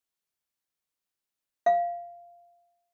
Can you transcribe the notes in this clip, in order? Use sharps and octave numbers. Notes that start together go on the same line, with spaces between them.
F5